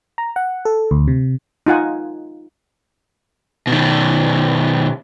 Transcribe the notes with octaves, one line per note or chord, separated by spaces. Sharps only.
A#5
F#5
A4
D2
C3
D#4 F4 F#5 G#5
B2 D#3